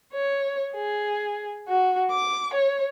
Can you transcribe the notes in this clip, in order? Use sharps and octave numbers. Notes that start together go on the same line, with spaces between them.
C#5
G#4
F#4
D6
C#5